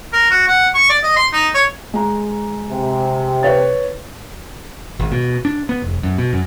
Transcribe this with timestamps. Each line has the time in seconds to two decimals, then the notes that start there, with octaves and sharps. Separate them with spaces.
0.13 A#4
0.31 F#4
0.48 F#5
0.74 C#6
0.89 D5
1.03 D#5
1.16 C6
1.33 D#4
1.54 C#5
1.94 G#3 A#5
2.70 C3
3.43 B4 C#5 A6
5.00 G#1
5.12 B2
5.45 D4
5.69 B3
5.82 F1
6.03 F#2
6.18 B2
6.33 F#2